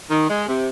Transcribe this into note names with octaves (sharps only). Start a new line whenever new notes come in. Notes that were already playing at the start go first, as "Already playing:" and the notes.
D#3
G#3
C3